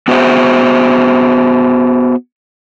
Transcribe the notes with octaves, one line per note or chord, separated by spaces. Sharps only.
B3 F#4 G#4 A#4 C5 E5